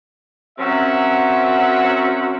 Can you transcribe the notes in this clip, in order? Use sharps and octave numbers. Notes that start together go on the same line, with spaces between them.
F#2 F#3 C4 C#4 E5 F#5